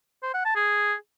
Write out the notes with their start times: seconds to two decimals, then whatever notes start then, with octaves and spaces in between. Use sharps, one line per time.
0.23 C5
0.34 F#5
0.45 A5
0.56 G#4